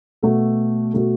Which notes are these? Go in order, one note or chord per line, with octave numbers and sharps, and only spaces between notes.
B2 A3 F#4 A4
B2 A3 F#4 A4